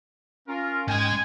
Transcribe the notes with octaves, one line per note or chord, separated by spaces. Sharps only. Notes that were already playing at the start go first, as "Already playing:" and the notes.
C#4 F4 A#4
G#2 G#3 D#5 G5 G#5